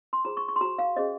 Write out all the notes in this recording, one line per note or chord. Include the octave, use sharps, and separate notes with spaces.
C6
F4 G#4 C5 A#5
C#6
C#6
C6
F#4 C5 A#5
F5
C#4 G#4 C5 D#5